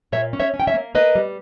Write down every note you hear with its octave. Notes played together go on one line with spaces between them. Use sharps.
A#2 C#5 E5
C#4
C#5 E5
C#4
G5
C#5 E5
A#3
A#3 B4 D#5
G3